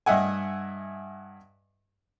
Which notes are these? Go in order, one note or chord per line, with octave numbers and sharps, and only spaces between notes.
G2 D#5 E5 F#5 G#5